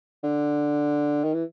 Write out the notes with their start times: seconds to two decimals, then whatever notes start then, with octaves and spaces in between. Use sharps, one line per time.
0.24 D3
1.24 D#3
1.34 E3